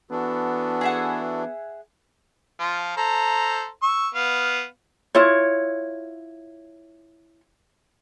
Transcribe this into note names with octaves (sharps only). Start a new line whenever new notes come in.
E3 B3 D4 F#4 A4
G#4 E5 F#5
F3 F4
A4 C5 A#5
C#6 E6
B3 F5
E4 F4 C#5